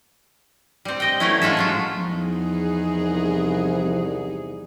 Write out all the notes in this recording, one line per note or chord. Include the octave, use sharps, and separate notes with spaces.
G3 C4
D#5 G5
E3 F#3 A3 C#4 E4
G#3 F4 A4 E5
A2 F#3 F4
E2 F3 D#4 G#4
C2